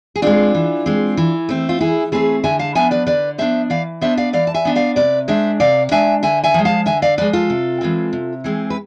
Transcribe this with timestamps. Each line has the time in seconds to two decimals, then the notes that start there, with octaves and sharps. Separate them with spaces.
0.16 G#4
0.22 G#3 C4 D4 F4
0.55 E3
0.86 G#3 C4
1.17 E3
1.49 A3 C4
1.69 F4
1.80 E3 E4 G#4
2.12 A3 C4 G#4 B4
2.44 D3 E5 G#5
2.59 F5 A5
2.75 F3 B3 D4 E5 G#5
2.91 B4 D5
3.07 D3 B4 D5
3.38 F3 B3 D4 C5 E5
3.70 E3 D5 F5
4.01 B3 D4 C5 E5
4.17 D5 F5
4.33 E3 D5 F5
4.47 A5
4.54 E5 G#5
4.65 B3 D4
4.76 D5 F5
4.96 C3 B4 D5
5.28 G#3 D4 C5 E5
5.60 C3 D5 F5
5.91 G#3 D4 E5 G#5
6.23 D3 E5 G#5
6.44 E5 G#5
6.54 F3 G#3
6.65 F5 A5
6.86 D3 E5 G#5
7.02 D5 F5
7.18 F3 G#3 B4 D5
7.33 F4 A4
7.50 C3
7.81 E3 G#3 C4
8.13 C3
8.44 E3 G#3 C4
8.70 B4